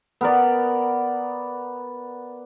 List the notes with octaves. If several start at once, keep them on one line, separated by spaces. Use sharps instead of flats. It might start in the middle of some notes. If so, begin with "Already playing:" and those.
B3 A#4 D5